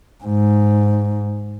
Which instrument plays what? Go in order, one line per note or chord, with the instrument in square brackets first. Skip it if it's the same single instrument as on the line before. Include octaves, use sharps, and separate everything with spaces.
[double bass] G#2